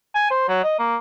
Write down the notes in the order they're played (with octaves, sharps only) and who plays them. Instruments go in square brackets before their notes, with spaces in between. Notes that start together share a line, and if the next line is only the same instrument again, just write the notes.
[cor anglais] G#5
C5
F#3
D#5
A#3